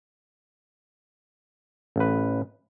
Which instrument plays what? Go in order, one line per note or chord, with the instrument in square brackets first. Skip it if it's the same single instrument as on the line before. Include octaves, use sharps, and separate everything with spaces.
[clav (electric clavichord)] A1 B4